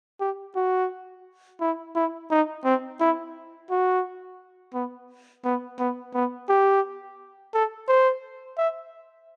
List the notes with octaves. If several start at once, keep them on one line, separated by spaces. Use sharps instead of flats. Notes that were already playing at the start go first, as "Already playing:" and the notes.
G4
F#4
E4
E4
D#4
C4
E4
F#4
B3
B3
B3
B3
G4
A4
C5
E5